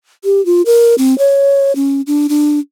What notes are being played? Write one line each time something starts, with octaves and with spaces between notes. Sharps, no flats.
G4
F4
A#4
C4
C#5
C#4
D4
D4